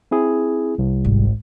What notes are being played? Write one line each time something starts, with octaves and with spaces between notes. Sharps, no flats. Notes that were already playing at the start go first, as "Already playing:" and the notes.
C4 E4 G#4
C2
G#1